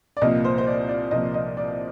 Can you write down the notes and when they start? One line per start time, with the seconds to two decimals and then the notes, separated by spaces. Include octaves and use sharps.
0.17 D5
0.21 C2 A#2 F3 A#3 D#5
0.44 C5
0.58 C5
0.67 D5
0.89 D5
1.11 C2 A#2 F3 A#3 D#5
1.34 D#5
1.57 D5